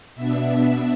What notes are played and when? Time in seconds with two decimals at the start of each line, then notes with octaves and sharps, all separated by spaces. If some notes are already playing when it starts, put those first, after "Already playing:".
0.15 B2 B3 D4 E5